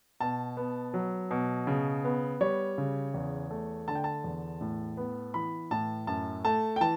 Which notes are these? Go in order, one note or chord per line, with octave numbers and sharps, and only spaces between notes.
B2 A5
B3
F#3
B2
C#3
B3
G3 C#5
C#3
E2
A3
D3 A5
G5
A5
E2
A2
B3
E3 B5
A2 A5
F#2 A5
A3 A5
G5
E3 A5